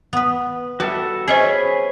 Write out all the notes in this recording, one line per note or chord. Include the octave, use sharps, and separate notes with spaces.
B3 B4
G3 F#4 A4 B4 E5
C#4 G#4 B4 C5 D#5 G#5